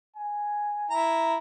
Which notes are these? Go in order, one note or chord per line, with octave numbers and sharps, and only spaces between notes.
G#5
E4 A#5